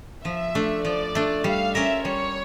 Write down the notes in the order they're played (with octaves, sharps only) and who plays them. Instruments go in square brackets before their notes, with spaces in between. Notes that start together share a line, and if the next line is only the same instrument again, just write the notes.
[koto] F3 [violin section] E5
[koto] A3 D4
[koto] F3 [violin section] D5
[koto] A3 D4
[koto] G3 [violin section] F5
[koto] C#4 F4 A#4 [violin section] E5
[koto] G3 [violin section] C#5